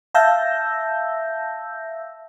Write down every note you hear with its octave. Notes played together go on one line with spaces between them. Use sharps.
E5 F5 A5 E6 G6 A#6